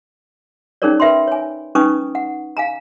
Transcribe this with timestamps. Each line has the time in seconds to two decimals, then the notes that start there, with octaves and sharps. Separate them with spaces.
0.82 C#4 D#4 G#4 A#4 C#5 D5
1.00 A#4 B4 E5 G5 B5 C6
1.28 C#5 G#5
1.75 C#4 D#4 B4 G#5 C#6 D#6
2.15 F#5
2.57 F5 G#5 A#5